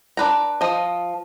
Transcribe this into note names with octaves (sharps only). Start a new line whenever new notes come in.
D4 B4 A#5
F3 D#5